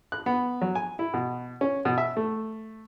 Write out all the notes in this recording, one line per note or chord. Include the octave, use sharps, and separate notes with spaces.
F#6
B3
F#3
G#5
E4
B2
C#4
B2
E5
A3